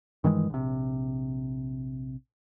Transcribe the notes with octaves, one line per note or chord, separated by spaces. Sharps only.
G2 D#3 E3 G#3
A#1 C3